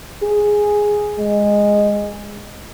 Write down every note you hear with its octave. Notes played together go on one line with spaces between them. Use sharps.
G#4
G#3